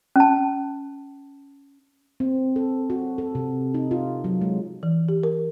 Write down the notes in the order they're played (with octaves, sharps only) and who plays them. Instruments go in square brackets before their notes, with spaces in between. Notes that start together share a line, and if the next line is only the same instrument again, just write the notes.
[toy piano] C#4 A5
[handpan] C4
A4
F#4
A4
C3
D#4
F4
F#3
G#3
[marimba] E3
G4
A#4